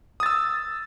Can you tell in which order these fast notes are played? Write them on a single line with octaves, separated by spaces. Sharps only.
D#6 A6 E6